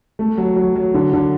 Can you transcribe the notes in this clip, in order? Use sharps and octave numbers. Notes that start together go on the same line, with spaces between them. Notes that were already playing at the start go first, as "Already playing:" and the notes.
A3
F#3
F#3
F#3
D3
D3